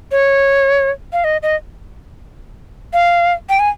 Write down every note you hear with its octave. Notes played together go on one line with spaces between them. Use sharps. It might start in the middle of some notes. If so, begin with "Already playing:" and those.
C#5
F5
D#5
D#5
F5
G5
G#5